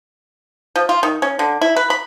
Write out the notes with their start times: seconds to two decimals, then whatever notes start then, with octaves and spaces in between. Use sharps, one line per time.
0.76 F3
0.89 F4
1.03 D#3
1.22 C#4
1.39 D3
1.61 E4
1.76 B4
1.90 B5